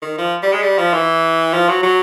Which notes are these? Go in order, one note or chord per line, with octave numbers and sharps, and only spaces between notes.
D#3
F3
G3
G#3
G3
F3
E3
F3
F#3
F#3